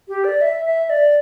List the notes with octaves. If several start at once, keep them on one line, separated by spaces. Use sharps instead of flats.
G4
D5
E5
E5
D5